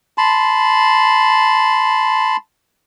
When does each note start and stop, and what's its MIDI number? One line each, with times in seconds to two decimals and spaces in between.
0.18 2.36 81
0.18 2.36 83
0.18 2.36 84